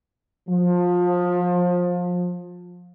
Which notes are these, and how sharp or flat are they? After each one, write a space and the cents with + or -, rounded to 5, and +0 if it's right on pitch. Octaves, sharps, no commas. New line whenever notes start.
F3 +25